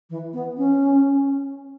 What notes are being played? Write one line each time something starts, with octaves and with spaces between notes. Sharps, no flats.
E3
B3
C#4